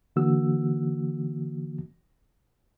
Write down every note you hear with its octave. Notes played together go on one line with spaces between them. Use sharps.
D3 E3 A#3 F#4 E6